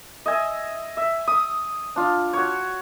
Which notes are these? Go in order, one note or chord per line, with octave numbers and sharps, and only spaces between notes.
D#5 E5 G#5
E5
D#6
D4 F4
F#4 C#5